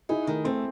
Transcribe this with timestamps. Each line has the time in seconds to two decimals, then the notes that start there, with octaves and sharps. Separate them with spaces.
0.09 D#4 E4 G#4
0.27 D#3 A3
0.45 A3 C4